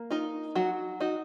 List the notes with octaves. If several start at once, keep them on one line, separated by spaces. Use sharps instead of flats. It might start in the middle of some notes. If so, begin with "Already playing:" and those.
Already playing: A#3
D#4 F4
F#3 F#4
D#4 F#4